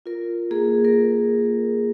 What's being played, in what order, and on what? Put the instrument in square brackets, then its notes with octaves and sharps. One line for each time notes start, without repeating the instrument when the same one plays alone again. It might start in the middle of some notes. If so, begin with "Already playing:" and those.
[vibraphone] F4 A#4
A#3 G#4
A#4